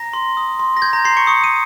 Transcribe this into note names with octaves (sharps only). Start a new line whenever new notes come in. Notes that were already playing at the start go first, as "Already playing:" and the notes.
Already playing: A#5 A#6
C6
D#6
C6
A#6
G6 G#6
A#5 A#6
A#5 C6 C7
C#6 C#7
C#6 D#6 C#7
D#6 D#7